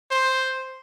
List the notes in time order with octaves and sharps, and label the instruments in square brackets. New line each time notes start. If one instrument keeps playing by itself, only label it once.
[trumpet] C5